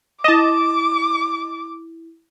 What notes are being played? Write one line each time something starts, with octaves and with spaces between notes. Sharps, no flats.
E4 D#5 A5 D6 E7